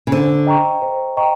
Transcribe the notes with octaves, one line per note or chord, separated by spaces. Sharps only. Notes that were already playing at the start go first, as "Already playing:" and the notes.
C#3
D3 C5
D#5 G5 A#5 C#6
C5
D#5 G5 A#5 C#6